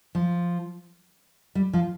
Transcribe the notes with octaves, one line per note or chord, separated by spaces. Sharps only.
F3
G3
F3